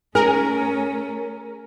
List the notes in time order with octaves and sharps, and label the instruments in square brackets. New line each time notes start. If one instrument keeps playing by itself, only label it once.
[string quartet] A3 C#4 [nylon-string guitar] G#4 [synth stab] A#4